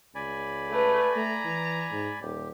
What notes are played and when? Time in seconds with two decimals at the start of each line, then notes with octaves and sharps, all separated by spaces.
0.15 C#2 D5 G#5 B5
0.70 A3 B4
1.16 A3 A#5
1.45 E3
1.91 G#2
2.21 D#1 G4